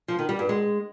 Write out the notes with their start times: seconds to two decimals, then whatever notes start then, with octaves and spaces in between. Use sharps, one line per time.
0.08 F3
0.19 D#3
0.29 G3
0.39 G2
0.49 G#3